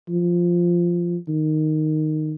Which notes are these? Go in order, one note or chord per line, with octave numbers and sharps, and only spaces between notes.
F3
D#3